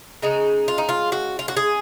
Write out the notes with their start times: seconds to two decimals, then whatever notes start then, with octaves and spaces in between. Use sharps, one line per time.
0.22 C#3 G#3 D#4
0.68 F4
0.78 D#4
0.89 F4
1.12 F#4
1.39 F4
1.48 F#4
1.57 G#4